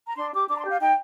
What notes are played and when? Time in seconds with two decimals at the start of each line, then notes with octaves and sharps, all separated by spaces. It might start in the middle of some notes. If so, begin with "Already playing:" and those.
0.07 A#5
0.16 D4 C6
0.33 G4 D6
0.49 D4 D6
0.55 A#5
0.59 C6
0.64 G4
0.69 F5
0.80 D#4 G5